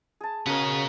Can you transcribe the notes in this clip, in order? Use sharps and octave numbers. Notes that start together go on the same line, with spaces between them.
G#4 A5
C#3 B3 F#4 A#4 D#5